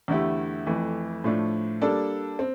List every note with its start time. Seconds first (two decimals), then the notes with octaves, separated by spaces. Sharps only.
0.08 E2 D3 A3 E4 G4
0.66 F2 E3 A3
1.24 A2 F3 A3 D4
1.81 G3 A#3 D4 A4 D5
2.39 C4